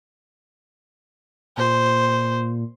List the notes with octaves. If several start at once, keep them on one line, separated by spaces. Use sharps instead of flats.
A#2 C5